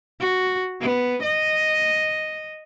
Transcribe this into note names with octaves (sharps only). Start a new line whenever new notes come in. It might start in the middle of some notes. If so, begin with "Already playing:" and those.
F#4
B3
D#5